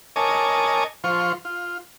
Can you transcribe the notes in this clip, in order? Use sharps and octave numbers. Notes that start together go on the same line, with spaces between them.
A#4 C#5 D#5 G#5 A5 D6
F3 F4 C5 C#6
F4